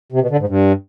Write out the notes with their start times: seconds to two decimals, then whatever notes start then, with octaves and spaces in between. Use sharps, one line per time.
0.12 C3
0.21 B2
0.30 D3
0.39 G#2
0.48 G2